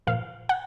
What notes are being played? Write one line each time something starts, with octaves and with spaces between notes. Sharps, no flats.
A#2 F3 F5
F#5